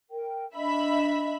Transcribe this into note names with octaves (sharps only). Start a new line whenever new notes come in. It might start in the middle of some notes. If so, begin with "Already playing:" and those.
A#4 G5
D4 D#5 E5 B5